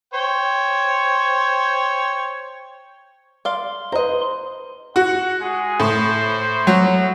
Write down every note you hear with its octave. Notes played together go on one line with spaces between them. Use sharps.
C5 C#5 G5
D5 F5 C6
B4 C5 D#5 A#5
F#4 F#5
G#3 G#4
A2 C5
F#3